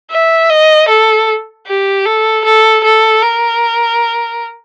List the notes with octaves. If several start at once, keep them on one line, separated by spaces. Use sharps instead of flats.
E5
D#5
A4
G4
A4
A4
A4
A#4